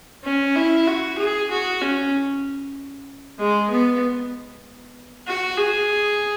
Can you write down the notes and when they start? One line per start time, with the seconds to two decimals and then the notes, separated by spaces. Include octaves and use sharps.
0.24 C#4
0.56 E4
0.87 F#4
1.18 G#4
1.51 F#4
1.81 C#4
3.39 G#3
3.71 B3
5.27 F#4
5.58 G#4